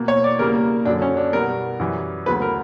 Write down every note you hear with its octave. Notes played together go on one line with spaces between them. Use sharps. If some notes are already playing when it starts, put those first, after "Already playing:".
Already playing: B2 A#3
C#5
D5
E2 C#3 G3 A#3 A#4
F#2 D3 F#3 D4
C#4
D4
B2 G3 B3 A#4
F#2 E3 G3
D2 C#3 F#3 B3 B4
A#4